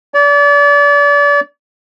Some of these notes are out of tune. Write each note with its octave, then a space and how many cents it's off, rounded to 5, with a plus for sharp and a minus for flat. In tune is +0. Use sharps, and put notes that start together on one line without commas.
D5 -35